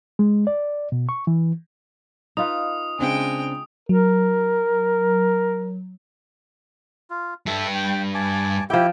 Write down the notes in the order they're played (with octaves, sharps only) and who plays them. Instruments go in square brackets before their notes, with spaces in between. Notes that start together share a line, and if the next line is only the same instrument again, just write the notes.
[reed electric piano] G#3
D5
B2
C#6
E3
[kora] D#4 F4 B4 [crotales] D#6
[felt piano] C#3 C4 D4 [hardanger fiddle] G#3 G5
[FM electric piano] F#3 [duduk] A#4
[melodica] F4
[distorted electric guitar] G2 [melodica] A4 E5
[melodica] G5
G#5 A5 D6
[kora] F3 G5 [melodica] E4 G4